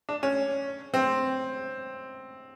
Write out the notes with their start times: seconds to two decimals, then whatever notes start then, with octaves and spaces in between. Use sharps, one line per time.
0.09 D4
0.23 C#4
0.94 C4